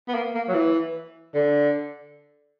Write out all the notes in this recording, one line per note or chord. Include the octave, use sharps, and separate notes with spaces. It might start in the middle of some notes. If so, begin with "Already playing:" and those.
B3
A#3
A#3
F#3
E3
D3